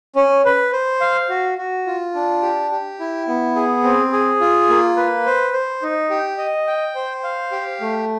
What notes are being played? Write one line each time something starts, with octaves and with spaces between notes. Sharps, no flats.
C#4
B4
C5
F5
F#4
F#4
F4
D4
G4
G4
E4
B3
G#4
C4
G#4
F4
A#3
B4
C5
C5
D#4
G4
D#5
G5
C5
F5
G4
A3